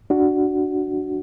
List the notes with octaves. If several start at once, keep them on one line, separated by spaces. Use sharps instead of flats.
D4 F#4